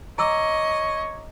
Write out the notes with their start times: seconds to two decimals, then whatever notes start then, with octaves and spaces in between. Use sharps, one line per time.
0.18 C#5 D#5 A#5 D6 E6